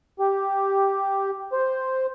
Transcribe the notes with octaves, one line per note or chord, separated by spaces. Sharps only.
G4
C5